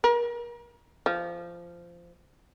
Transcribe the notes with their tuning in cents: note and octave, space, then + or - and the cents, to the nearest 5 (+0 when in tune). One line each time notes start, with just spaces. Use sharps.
A#4 +35
F3 -15